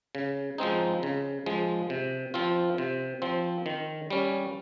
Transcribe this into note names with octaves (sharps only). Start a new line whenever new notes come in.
C#3
F3 G#3 C4 D#4
C#3
F3 G#3
C3
F3 C4 F4
C3
F3 C4
D#3
G3 C#4